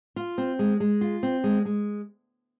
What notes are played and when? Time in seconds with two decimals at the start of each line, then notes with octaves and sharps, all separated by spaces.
0.16 F4
0.38 C4
0.59 G#3
0.80 G#3
1.01 F4
1.23 C4
1.44 G#3
1.65 G#3